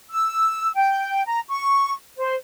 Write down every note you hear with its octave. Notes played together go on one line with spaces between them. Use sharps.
E6
G5
A#5
C#6
C5